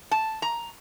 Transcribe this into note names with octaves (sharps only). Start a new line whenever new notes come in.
A5
A#5